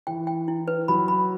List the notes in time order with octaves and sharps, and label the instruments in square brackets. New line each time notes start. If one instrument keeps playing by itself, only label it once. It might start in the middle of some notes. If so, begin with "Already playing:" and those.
[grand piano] E3 [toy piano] G5
[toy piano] G5
E4
B4
[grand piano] F#3 [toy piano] B5
[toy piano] B5